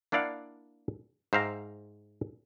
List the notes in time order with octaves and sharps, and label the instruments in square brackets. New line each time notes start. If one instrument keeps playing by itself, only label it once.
[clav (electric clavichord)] A#3 D4 E4 D5 F5 F#5
G#2 C5 E5 F5 G5 A#5